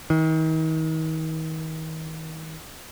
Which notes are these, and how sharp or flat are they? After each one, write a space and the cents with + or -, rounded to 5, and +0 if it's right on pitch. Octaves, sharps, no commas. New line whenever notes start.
D#3 +40